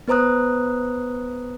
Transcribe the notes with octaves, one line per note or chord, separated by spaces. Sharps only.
B3 B4 C5 A#5 D#6 F#6